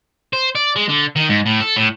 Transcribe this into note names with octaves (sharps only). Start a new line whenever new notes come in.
C5
D5
G#3
D3
D#3
G#2
A2
A4
A2